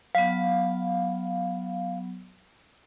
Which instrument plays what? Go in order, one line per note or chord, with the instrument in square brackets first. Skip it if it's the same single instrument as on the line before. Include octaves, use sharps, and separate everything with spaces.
[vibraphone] F#3 B3 [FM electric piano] F5